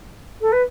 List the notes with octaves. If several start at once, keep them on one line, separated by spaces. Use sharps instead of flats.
A4
B4